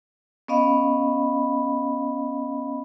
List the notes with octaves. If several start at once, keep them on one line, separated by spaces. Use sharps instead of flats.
B3 C#4 D#5 F5 B5